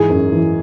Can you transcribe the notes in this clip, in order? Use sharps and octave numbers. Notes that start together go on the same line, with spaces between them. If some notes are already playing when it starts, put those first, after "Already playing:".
Already playing: G#2 E3 G#4
F#2
E3